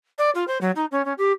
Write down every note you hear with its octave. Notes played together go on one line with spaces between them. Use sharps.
D5
F4
C5
F#3
D#4
C#4
C#4
G4